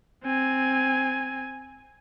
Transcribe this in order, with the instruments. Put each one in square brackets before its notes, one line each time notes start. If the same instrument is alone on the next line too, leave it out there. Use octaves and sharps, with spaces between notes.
[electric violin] C4 G#5